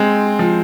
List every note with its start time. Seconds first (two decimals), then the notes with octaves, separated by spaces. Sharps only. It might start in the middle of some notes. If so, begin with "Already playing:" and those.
Already playing: G#3 C4
0.39 F3